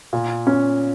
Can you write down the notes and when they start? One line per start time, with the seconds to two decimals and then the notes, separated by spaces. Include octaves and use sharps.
0.13 A#2
0.47 C#4